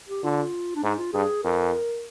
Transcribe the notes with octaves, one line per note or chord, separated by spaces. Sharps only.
G4
D3 F4
D4
G#2 D#4
F4
G2 G#4
F2 A#4